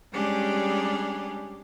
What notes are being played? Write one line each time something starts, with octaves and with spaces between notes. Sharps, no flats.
G3 G#3 C#4 D4 G4 G#4